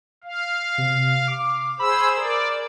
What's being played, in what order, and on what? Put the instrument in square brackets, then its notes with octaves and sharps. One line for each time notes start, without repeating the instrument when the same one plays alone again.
[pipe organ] F5
[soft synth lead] C3
D6
[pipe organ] G#4 C5 E6 [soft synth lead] B5
[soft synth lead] A#4 [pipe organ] D5